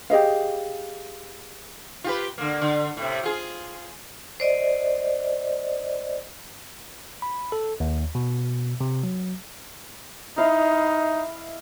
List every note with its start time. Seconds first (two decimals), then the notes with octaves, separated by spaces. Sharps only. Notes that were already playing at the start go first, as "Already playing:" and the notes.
0.10 G4 G#4 D#5 F5
2.04 F4 G4 B4
2.38 D3 A#3
2.62 D3
2.97 A2 C3
3.23 F4 G#4
4.40 C5 D5 D#5
7.22 B5
7.52 A4
7.80 D#2
8.15 B2
8.81 C3
9.04 F#3
10.38 D#4 E4 D#5 F5